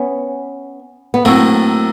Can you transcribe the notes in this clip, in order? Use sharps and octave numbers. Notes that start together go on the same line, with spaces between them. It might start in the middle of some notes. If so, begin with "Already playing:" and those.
Already playing: B3 C#4
B3
A2 F#3 A3 A#3 C4 C#4